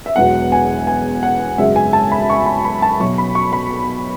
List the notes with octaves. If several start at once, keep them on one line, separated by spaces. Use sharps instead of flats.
E5
E1 E2 B2 F#3 F#5
G#5
G#5
F#5
G#1 F#2 C#3 G#3 E5
G#5
A5
B5
C#6
B5
B5
A5
B1 B2 F#3 C#6
B5
C#6
B5
C#6